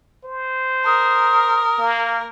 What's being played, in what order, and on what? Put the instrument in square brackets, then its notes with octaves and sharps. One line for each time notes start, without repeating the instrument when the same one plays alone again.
[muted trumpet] C5
[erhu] A#4 [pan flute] D#6
[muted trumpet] A#3